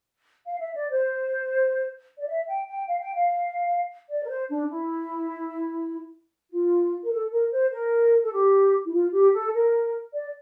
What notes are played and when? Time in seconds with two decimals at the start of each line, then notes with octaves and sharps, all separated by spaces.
0.45 F5
0.60 E5
0.75 D5
0.91 C5
2.17 D5
2.27 E5
2.47 G5
2.67 G5
2.87 F5
3.00 G5
3.14 F5
4.09 D5
4.24 A#4
4.28 C5
4.49 D4
4.69 E4
6.50 F4
7.03 A#4
7.11 A4
7.31 A#4
7.51 C5
7.71 A#4
8.22 A4
8.32 G4
8.85 E4
8.92 F4
9.13 G4
9.33 A4
9.53 A#4
10.13 D5